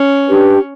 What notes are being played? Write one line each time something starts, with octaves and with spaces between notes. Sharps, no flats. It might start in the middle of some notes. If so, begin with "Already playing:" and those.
Already playing: C#4
D4 G4 B4